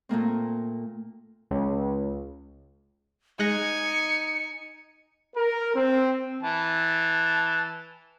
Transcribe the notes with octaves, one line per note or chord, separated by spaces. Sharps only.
A#2 A3 A#3 C4
C#2
G#3 D#4 G#5 F#6 A#6 C#7
A#4
C4
E3 A5